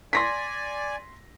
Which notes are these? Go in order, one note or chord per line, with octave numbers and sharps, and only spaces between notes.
D5 G#5 C6 A#6 B6